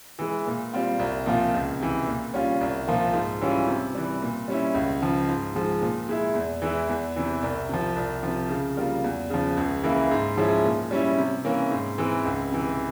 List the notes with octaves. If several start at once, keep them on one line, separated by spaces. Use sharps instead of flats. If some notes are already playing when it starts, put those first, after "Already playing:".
E3 G#3
A#2
G3 C4 F4
C2
A#2 F3 C4 F4
C#2
C3 E3
A#2
G3 C#4 F4
C2
A#2 F3 A#3 F4
G#2
E3 G3 C#4 F4
C3
E3 G3
A#2
G3 C#4 E4
C#2
C#3 F3
G#2
F3 G#3
A#2
G#3 E4
E2
E3 G#3 E4
E2
C3 E3
C2
C3 F3
C2
C3 F3
C#3
G3 A#3 F4
E2
C#3 F3
C#2
C#3 E3 A#3 E4
G#2
F3 G#3 C#4 E4
A#2
G3 C#4 E4
C3
E3 A#3 C#4
G#2
E3 G#3 C4
C#2
C3 E3